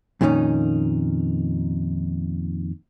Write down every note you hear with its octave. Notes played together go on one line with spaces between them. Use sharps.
F2 A#2 D#3 G3 C#4 D#4